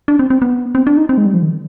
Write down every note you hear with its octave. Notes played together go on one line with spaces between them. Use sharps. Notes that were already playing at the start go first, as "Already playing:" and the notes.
D4
C4
C4
B3
C4
D4
D#4
C4
G#3
G3
F3
D#3